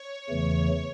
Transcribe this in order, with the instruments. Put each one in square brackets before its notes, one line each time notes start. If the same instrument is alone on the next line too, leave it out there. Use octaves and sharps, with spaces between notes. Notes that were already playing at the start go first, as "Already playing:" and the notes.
Already playing: [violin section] C#5
[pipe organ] E2 C#3 E3 A3